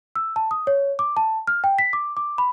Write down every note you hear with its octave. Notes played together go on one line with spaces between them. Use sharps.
E6
A5
D#6
C#5
D6
A5
F6
G5
B6
D6
D6
B5